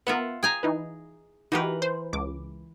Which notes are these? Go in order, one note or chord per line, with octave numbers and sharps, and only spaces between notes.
B3 F4 A#4 E5 F#5
G#4 G5 G#5 A#5
E3 D#4 B4
E3 D#4 F#4 G4 A#4 B4
C5
C#2 D6